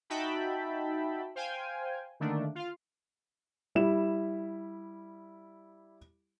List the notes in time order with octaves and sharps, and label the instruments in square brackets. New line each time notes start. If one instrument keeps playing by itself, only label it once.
[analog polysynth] D#4 F#4 E5 G5 A5 B5
C5 F5 G5 G#5
D3 D#3 A3 A#3 D4
F4 F5
[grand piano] G3 E4 E7